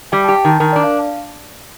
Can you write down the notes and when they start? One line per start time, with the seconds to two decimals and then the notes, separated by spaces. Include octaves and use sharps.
0.12 G3 G5
0.24 A5
0.28 G4
0.36 G5
0.45 D#3 A5
0.60 D#3 A#4
0.73 D5
0.76 D4
0.84 F5